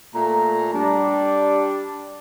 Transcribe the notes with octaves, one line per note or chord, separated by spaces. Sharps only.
A#2 A3 A#5
G3 D4